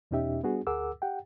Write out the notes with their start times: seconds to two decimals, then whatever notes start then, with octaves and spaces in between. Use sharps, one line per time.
0.11 E2 B2 C#4 D#4 G4 E5
0.43 G3 B3 D4 F#4 G#4
0.67 D2 G#4 A#4 F#5 D6 E6
1.02 G4 F#5 G5